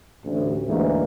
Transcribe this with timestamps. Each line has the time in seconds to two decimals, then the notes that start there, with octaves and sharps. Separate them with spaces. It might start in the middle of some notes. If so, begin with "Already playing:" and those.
0.25 A1 D2
0.68 D2 G#2 E3 A#3